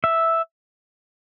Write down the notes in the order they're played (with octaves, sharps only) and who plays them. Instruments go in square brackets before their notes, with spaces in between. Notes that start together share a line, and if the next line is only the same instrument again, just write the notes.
[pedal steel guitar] E5